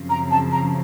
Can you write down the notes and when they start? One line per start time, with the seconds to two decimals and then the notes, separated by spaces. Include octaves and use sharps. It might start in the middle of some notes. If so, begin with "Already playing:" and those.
Already playing: F#2 C#3 F3 C4
0.09 A#5
0.30 A5
0.52 A#5